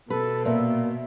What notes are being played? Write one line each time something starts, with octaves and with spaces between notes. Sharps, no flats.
B2 A4 B4
A#2 E5